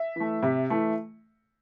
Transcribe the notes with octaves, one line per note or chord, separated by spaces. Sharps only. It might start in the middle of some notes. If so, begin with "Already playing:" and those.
Already playing: E5
E3 A3
C3
E3 A3